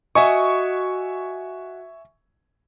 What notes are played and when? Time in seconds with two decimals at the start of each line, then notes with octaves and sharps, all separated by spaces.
0.15 F#4 D#5 E5 G#5 C#6